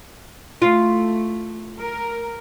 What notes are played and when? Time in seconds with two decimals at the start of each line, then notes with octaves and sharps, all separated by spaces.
0.62 A3 F4
1.81 A#4